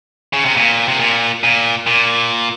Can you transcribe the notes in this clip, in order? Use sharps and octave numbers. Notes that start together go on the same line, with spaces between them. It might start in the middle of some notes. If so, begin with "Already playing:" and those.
C#3
C3
A#2
C3
A#2
A#2
A#2